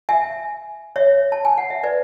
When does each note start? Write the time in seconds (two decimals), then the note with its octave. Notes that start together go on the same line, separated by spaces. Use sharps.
0.09 E5 G#5
0.96 C#5 E5
1.32 A5
1.45 G#5
1.58 F#5
1.70 E5
1.83 B4 D5